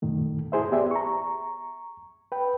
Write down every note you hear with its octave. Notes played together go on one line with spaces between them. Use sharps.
F#2 A#2 D#3 A3
E4 G#4 C5 E5
B3 G4 G#4 D5 E5
A#5 C#6
B4 G5